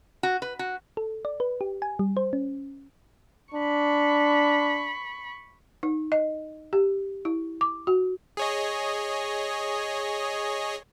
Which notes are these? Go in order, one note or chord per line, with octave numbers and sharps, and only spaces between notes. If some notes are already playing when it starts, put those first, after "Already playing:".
F#4
B4
F#4
A4
D5
B4
G4
G#5
G3
C5
C#4
D4 B5 C#6
D#4
D#5
G4
E4
D6
F#4
G#4 C#5 D#5